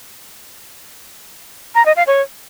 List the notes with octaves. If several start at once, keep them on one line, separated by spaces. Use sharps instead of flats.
A#5
D#5
F5
C#5